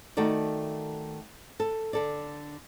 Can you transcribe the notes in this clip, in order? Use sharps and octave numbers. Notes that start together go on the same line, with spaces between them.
D#3 A3 F#4 A4 D5
A4
D3 A4 D5